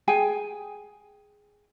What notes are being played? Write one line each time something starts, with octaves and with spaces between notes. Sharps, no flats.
G#4 G5 G#5